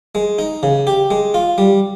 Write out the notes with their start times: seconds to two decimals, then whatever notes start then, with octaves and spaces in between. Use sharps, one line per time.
0.15 G#3
0.39 D#4
0.63 C#3
0.87 G4
1.11 G#3
1.34 F4
1.58 G3